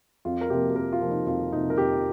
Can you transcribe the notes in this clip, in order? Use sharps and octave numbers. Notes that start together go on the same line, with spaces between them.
F2 F4
A#4
C3 F3 A#3 G4
G4
F2 A#4
F4
C3 F3 A#3
D#4
F2 F4
C3 F3 A#3 D#4
A#4
F2 G4